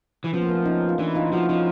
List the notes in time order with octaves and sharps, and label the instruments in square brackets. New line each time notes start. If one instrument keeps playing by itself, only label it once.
[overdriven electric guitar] E3
[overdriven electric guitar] F3 [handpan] B3 C#4
[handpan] A#3
A3 B3
C#4 D#4
F4
[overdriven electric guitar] E3 [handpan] D4 E4
[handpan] D#4 F4
[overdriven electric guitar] F3 [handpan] E4 F#4
[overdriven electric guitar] F3 [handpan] C#4 D#4